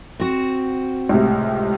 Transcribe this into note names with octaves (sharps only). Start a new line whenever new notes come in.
C4 F#4
C#2 A2 C3